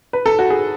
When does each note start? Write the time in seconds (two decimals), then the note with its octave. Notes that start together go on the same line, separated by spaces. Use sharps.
0.13 B4
0.26 A4
0.39 F#4
0.50 G#4